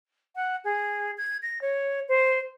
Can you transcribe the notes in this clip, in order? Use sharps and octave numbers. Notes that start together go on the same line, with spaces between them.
F#5
G#4
G#6
A#6
C#5
C5